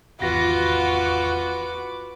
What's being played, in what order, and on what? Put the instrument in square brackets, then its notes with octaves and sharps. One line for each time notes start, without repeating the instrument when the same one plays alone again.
[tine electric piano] G#1 E2 A#6 [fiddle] F4 [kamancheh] F#4 [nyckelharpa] B4 D6